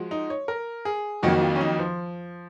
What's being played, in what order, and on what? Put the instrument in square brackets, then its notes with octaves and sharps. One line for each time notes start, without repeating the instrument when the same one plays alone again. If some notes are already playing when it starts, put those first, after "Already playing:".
Already playing: [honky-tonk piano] F3 G#3 F#4
[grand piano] D#4
C#5
A#4
G#4
[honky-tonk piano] F2 D#3 F#3 A#3 [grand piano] F#4
[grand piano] F4
C#4
D#4
F3